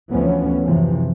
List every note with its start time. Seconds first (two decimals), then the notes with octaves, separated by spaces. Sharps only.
0.11 D2 E3 F3 B3 C#4
0.65 F#2 C3 E3 F3